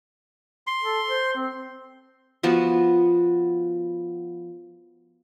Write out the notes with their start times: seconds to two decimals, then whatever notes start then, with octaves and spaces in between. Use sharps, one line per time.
0.67 C6
0.82 A4
1.09 C5
1.36 C4
2.43 F3 B3 F#4